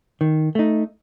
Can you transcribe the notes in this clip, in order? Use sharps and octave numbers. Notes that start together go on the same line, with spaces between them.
D#3
A3 D#4